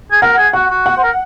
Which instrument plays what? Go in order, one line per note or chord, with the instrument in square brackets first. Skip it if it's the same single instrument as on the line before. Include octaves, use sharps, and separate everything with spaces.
[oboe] G#4
[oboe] A#4 [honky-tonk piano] F#5
[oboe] G#4
[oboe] F#4 [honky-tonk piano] F#5
[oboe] F#4
[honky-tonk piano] F#5
[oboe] C5
A#4